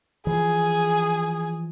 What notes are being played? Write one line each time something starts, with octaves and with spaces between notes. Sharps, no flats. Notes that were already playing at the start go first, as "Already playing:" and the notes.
E3 F3 G#4